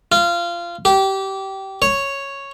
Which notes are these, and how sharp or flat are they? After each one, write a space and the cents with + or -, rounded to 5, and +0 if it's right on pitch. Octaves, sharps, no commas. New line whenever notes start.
F4 -20
G4 -20
C#5 -5